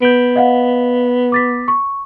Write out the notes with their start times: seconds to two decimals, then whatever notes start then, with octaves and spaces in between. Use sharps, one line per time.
0.02 B3 G6 D7
0.36 D#5 F5 F#5
1.32 D6 A6 B6
1.68 C#6